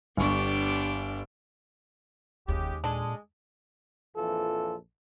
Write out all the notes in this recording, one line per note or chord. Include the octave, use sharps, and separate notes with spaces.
G1 B3 D4 G4 C#6
F1 D#2 C#3 G#3 G4
A#2 G#3 D4 A4
A#1 F2 E3 F4 A4